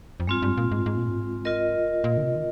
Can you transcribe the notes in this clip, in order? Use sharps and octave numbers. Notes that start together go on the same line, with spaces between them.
F2
G2 G#3 C4 F4
G2
A#2
G#2
G#2
A#2
G#2
F4 A#4 D#5
A#2
D3
C3
D#3